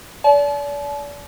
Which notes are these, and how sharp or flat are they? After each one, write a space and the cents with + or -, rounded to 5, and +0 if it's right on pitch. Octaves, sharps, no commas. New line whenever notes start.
D5 -35 A5 -40